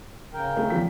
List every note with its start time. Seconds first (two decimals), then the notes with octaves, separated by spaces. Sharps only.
0.34 C#3 A#4 G5
0.57 A3 G#4
0.70 E2 F3 B6